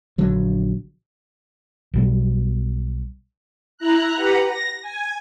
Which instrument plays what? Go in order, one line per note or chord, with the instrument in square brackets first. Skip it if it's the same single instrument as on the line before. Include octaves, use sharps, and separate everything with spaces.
[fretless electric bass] A#1 D3 F#3
[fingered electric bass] B1 B2 G3
[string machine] E4 A#5 F#6
G4 B4 F#5 A#5
A#6
G#5